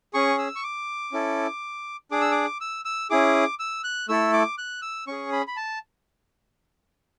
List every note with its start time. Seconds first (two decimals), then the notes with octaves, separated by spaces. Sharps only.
0.14 C#4 G#4 C#6
0.38 E6
0.55 C#6
0.63 D6
1.12 C#4 E4 A4
2.11 D4 G#4 D6
2.21 E6
2.31 D6
2.61 E6
2.85 E6
3.10 C#4 E4 G#4 D6
3.59 E6
3.84 F#6
4.09 A3 E4 A4 E6
4.33 D6
4.58 F#6
4.82 E6
5.07 C#4 G#4 C#6
5.32 B5
5.47 B5
5.56 A5